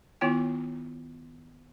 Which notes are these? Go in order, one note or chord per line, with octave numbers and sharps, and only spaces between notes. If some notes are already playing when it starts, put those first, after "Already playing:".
D#3 B3 E4 F4 C#5 G5